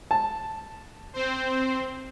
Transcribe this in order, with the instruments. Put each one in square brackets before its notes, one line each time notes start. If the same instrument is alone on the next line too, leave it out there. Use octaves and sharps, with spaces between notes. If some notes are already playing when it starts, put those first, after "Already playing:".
[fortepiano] A5
[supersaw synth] C4 C5